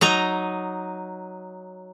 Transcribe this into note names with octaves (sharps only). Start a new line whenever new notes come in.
F#3 D#4 A#5